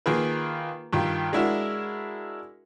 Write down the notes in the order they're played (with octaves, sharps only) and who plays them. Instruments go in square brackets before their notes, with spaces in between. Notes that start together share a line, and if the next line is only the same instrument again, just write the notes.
[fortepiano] D#3 A#3 F4 G#4 A#4 B4
G2 D#3 F4
G#3 D4 E4 F#4 A#4 E5